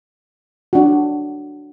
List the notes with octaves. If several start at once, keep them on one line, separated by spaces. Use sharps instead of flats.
D4 F#4